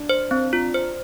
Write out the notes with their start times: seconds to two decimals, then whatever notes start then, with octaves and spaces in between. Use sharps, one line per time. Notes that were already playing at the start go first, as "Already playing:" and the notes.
Already playing: D4
0.10 C5
0.31 C4
0.53 F4
0.74 C5